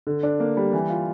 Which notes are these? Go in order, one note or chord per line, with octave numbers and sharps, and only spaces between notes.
D3
D4
A#3
G3
E3
F4